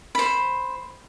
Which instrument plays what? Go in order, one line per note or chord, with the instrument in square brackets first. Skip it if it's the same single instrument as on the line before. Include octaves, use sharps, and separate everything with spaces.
[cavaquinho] C5 B5